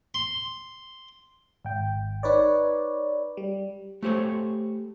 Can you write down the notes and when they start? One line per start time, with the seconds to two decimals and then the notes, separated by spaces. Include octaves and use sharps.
0.14 C6
1.65 G#1 G5
2.23 D#4 B4 C#5 D5
3.37 G3
4.02 A3 G4 C5 C#5